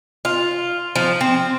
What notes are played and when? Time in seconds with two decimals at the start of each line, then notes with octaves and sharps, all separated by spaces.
0.25 F4
0.95 F3
1.21 C4